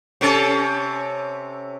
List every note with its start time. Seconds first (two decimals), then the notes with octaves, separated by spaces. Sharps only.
0.21 C3 C#4 A4